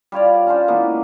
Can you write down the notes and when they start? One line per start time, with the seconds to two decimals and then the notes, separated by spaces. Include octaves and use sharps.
0.12 G3 F4 C#5 D5
0.47 C#4 D4 F4 C5
0.68 E3 G#3 A#3 B3